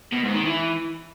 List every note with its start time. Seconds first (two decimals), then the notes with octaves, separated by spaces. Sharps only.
0.12 B2
0.23 G#2
0.34 D#3
0.45 E3